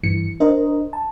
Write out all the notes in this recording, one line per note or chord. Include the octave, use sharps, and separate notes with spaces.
G2 E3 C#7
D4 A#4 C5 D#5
A5